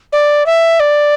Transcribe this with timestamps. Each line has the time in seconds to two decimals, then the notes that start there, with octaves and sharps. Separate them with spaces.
0.12 D5
0.46 E5
0.80 D5